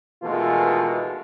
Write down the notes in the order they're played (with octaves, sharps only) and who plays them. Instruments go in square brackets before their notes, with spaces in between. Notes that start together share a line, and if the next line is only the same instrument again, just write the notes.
[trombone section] B2 D#3 E3 G#3 A3 F4